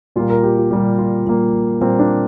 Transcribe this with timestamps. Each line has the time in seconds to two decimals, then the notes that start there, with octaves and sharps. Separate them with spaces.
0.16 A#2 G3 A#3 F4
0.30 A#4
0.43 G4
0.57 F4
0.70 A#2 G3 A#3 G4
0.98 F4
1.26 A#2 G3 A#3
1.81 A#2 G3 A#3 C4
1.99 D4